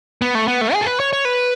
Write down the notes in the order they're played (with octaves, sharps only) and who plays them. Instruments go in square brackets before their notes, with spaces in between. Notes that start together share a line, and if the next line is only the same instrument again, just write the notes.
[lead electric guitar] B3
A3
B3
A3
G#4
A4
B4
C#5
C#5
B4